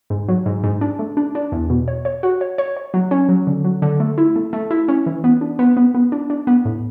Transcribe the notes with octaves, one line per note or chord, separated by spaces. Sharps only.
G#2
F#3
G#2
G#2
D4
A3
D4
D4
E2
B2
C#5
C#5
F#4
C#5
C#5
C#5
F#3
C#4
F#3
D3
F#3
D3
A3
E4
A3
A3
E4
C#4
E3
B3
D4
B3
B3
B3
D4
D4
B3
A2